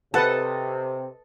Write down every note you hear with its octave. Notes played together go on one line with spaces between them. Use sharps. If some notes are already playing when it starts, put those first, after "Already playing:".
C3 A4 B4 D#5 F#5 A5